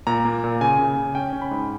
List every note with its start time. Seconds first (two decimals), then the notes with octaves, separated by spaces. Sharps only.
0.07 A#2 A#5
0.25 A#3
0.44 A#2
0.61 C#3 G#5
0.79 C#3
0.97 C#3
1.15 C#4 G5
1.33 C#4
1.42 B5
1.51 G#2